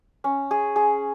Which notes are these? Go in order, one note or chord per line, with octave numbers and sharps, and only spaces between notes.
C#4
G#4
G#4